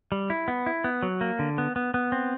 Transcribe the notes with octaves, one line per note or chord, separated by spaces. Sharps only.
G3
E4
B3
E4
B3
F#3
A#3
D3
B3
B3
B3
C4